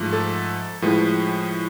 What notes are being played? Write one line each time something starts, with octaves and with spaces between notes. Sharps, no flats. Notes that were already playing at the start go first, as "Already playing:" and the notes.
Already playing: G#2 F3 A3
A4
A2 F3 G#3 B4